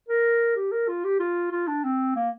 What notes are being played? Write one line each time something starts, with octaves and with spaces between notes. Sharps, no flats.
A#4
G4
A#4
F4
G4
F4
F4
D4
C4
A#3